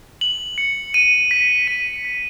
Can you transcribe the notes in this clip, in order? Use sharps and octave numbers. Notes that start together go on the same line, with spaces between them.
F#7
C#7
D#7
B6
D#7
B6